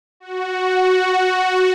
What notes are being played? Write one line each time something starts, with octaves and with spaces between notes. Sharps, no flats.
F#4